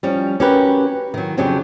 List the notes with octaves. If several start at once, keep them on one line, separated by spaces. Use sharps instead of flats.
F3 G3 C#4
C#4 F#4 G4 A#4 B4
D#3 F#3
F2 C#3 F#3 C#4 D4 G4